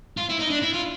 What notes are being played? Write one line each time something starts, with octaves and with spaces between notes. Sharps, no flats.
F4
E4
D#4
D4
E4
F4